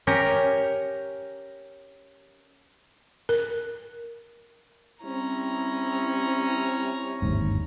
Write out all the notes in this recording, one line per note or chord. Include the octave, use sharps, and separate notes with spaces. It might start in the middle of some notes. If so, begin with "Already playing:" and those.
C#4 G4 A#4
A#4
G3 C4 C#4 E4 A#5
G1 D#2 G#2